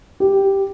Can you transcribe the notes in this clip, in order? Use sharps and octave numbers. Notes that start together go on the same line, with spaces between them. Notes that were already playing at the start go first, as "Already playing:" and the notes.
G4